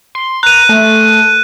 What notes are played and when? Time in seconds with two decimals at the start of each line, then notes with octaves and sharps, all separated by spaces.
0.15 C6
0.43 A#5 F#6 D#7
0.69 A3